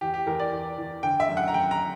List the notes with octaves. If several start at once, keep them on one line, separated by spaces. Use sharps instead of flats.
E2 G4
G4
E2 A#4
D5
E2
E2
D3 G5
E5
F#2
F#5
A#5
F#2 G5
A#5